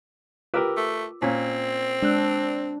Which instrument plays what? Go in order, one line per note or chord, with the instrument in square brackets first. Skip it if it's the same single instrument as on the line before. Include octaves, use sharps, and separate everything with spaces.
[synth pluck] F4 D6 E6 [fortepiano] G4 A#4 B4
[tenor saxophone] A3
[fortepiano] A#2 C#4 [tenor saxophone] C4
[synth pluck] G#3 E6 F#6 [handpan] D4